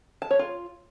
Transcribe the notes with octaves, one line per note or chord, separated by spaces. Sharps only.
A5
C#5
F4